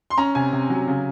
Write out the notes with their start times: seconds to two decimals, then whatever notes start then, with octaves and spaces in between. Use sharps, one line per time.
0.10 C6
0.18 C#4 A#5
0.35 C3 G#5
0.53 C3
0.70 F#3
0.87 C#3